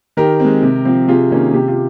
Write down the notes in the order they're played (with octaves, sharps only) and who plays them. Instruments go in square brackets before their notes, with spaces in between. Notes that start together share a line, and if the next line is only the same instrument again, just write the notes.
[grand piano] D#3 G4 A#4
G#3 C4
C3
F3 C4
C3 F4 G#4
D#3 A#3 C#4
C3 G4
F4